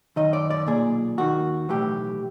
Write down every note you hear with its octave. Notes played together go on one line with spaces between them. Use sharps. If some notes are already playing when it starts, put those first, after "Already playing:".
F#2 D#3 D#5
D5
D5
B1 A#2 G#4
D#2 D#3 F#4
B1 A2 E3 G4